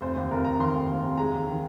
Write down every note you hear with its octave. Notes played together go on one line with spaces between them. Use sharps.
F1 C5
D#2 C5
F1 A#4
F1 A#5
D#3 C6
F1
D#2
F1
G#3 A#5
D#2
D#3